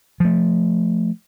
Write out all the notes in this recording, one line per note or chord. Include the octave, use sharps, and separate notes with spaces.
F3 A3